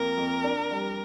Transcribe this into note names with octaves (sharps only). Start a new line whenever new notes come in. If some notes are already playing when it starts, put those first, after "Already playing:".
Already playing: F2 A#3 A#4
F2
D4
G3